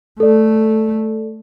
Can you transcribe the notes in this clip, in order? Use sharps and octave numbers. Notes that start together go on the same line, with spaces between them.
A3 A4 D5